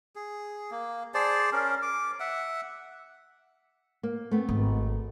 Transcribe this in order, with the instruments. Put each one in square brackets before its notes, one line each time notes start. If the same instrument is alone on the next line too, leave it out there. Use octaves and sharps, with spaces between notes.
[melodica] G#4
A#3
G#4 C5 D5 A5
C#4 A#4
D6
E5 F#5
[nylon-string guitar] A#3
A3 B3 C4
[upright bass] G#1